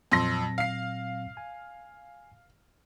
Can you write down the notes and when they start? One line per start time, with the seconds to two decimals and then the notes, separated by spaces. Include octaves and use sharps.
0.12 F2 A#2 F#3 C4 C6 A#6
0.58 F5 C7
1.37 G#5